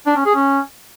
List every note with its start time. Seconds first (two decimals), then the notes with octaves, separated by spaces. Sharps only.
0.06 D4
0.16 C#4
0.26 G#4
0.35 C#4